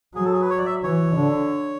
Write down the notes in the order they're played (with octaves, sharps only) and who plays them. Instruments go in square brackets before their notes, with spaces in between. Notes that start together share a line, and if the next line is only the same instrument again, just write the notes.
[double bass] F#3 [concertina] G#4
[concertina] A4
G#4
B4
C#5
D5
E5
[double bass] E3 [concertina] C#5
[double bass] D3